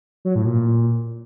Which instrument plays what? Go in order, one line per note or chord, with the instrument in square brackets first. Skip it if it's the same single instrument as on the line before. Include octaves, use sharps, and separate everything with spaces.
[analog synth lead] F#3
A2
A#2